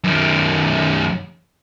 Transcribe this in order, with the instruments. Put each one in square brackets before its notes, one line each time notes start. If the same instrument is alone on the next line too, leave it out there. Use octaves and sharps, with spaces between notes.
[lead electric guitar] F#2 D#3